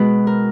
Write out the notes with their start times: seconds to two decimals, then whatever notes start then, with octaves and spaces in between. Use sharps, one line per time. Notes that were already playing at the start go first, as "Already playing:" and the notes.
Already playing: B2 G#3 B4
0.27 A#4